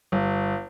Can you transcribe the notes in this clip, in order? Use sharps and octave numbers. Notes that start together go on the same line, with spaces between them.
G1